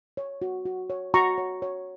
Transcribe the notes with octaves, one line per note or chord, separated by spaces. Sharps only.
C#5
F#4
F#4
C#5
F#4 A#5 C#6
C#5
C#5